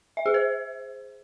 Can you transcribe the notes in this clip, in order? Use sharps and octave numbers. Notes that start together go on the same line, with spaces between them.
E5
G#4
C5